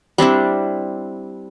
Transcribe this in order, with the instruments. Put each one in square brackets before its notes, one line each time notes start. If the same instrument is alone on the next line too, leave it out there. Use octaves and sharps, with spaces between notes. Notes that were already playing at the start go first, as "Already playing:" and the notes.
[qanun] G3 C4 D4 E4